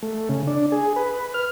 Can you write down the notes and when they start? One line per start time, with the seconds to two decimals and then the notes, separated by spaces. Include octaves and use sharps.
0.03 A3
0.29 C#3
0.47 D4
0.72 G#4
0.96 B4
1.34 F6